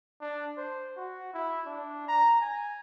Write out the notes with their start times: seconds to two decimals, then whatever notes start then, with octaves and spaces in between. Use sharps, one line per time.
0.21 D4
0.57 C5
0.97 F#4
1.33 E4
1.66 D4
2.08 A#5
2.41 G#5